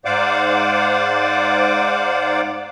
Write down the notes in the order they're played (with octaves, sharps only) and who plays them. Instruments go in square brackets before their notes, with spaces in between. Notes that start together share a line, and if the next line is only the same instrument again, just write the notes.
[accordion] G#2 C5 D5 F5 F#5 D6